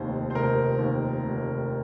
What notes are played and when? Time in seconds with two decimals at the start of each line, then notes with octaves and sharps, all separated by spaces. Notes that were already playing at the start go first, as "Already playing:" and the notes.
Already playing: F1 D#2 C5
0.30 C5
0.35 F1 A#4
0.79 D#2
1.24 F1